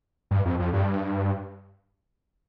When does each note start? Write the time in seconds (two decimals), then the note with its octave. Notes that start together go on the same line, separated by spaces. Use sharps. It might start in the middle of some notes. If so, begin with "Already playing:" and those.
0.31 G2
0.45 F2
0.59 F2
0.73 G2